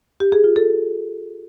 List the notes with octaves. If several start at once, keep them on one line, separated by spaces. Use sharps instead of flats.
G4
G#4
F4
A4